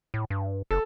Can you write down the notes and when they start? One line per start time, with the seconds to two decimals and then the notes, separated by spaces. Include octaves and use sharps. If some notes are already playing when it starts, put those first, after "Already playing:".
0.14 A2
0.30 G2
0.71 F#1 A4